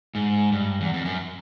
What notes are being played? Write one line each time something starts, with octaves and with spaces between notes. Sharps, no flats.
G#2
G2
E2
F2
F#2